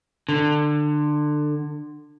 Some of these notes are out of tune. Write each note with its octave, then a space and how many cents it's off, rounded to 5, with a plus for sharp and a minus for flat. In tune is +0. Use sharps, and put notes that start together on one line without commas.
D3 +25